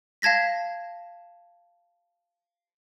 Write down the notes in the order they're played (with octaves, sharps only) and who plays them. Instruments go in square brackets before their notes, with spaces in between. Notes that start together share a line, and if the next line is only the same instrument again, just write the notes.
[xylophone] F5 A5 G#6 A#6 B6